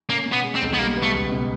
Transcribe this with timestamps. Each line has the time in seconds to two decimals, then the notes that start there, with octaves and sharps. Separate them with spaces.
0.09 A#3 C#4
0.26 B2
0.32 B3
0.43 G#3
0.55 C4
0.62 B1
0.74 B3
0.79 G3 A#3
0.97 B3
1.03 A3
1.14 C#2
1.32 B2